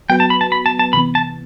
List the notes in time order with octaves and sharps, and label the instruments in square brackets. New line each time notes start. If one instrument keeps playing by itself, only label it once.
[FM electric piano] F#3 B3 F#4 B4 [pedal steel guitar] G5
[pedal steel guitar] A5
B5
A5
B5
A5
A5
[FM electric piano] C3 E3 B3 [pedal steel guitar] B5
[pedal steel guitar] A5